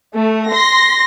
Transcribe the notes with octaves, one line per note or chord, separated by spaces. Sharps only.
A3
C6 A#6